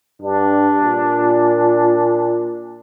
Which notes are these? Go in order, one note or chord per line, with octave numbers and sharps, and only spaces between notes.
G2 D4
A#2